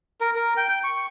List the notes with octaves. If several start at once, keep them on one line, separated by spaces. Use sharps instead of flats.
A#4
A#4
G5
G5
C#6